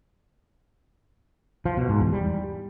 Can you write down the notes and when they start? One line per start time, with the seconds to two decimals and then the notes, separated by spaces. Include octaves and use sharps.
1.66 F3
1.77 B2
1.89 G#2
2.01 E2
2.13 G3